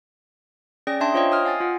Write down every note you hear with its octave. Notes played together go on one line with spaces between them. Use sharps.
C#4 G#4 D5 G5 D#6 A#6
D4 E5 G5 A5 C6
F4 C5 C#5 D#5 F5 G5
D#5 D#6 F6
F5 G#5 A6 C7
F4 F#5